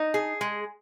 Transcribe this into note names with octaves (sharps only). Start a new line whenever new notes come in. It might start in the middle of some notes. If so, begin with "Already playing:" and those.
Already playing: D#4
G#4
G#3